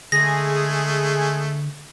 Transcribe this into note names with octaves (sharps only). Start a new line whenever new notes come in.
D3 G#3 A3 G#4 A#6